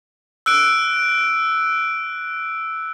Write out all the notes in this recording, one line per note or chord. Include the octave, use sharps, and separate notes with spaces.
E6 F#6 D7